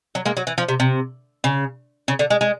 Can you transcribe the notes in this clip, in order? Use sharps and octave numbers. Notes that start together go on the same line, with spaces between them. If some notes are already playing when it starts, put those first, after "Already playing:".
F#3
G#3 A#3
F#3
E3
F3
C3
C3
C#3
C#3
D3
G#3
G#3